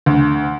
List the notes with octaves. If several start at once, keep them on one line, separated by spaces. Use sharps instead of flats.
D2